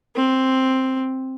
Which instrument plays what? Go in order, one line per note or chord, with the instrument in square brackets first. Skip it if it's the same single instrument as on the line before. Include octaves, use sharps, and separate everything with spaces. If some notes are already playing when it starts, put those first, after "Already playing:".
[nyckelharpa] C4